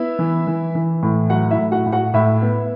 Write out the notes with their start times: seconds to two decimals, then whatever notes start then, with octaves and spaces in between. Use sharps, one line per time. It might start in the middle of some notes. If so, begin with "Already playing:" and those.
Already playing: B3 E4 E5
0.19 E3
0.47 E3
0.75 E3
1.03 A2
1.30 F#3 F#4 F#5
1.51 E4 E5
1.58 A2
1.72 F#4 F#5
1.86 A2
1.92 F#4 F#5
2.14 A2 E4 E5
2.42 B3